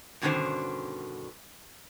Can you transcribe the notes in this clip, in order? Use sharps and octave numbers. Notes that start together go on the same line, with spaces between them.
G2 B2 D3 D#3 C#4 C5